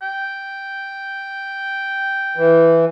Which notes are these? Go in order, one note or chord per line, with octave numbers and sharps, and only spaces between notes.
G5
E3